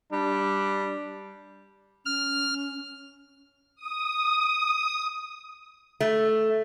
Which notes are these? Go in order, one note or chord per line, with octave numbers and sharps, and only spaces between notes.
G3 D4
C#4 F6
D#6
A3